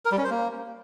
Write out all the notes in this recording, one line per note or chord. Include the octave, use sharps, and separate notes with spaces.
A#4
G3
C#4
C5
A#3